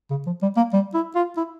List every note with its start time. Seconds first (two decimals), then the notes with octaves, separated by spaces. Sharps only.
0.10 C#3
0.26 F3
0.42 G3
0.57 A#3
0.73 G3
0.94 E4
1.15 F4
1.37 E4